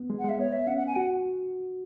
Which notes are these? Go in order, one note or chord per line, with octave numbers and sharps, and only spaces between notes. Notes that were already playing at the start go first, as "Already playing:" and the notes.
Already playing: B3
G#3
F#5
G#3 E5
B3 C#5
E5
C#4 F#5
F#5
G#5
F#4 F#5